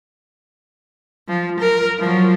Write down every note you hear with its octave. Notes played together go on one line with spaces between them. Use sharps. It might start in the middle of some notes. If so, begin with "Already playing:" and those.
F3
A#4
F3 F#3